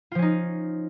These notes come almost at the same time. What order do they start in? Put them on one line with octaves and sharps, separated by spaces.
F4 F3 C#4 D#4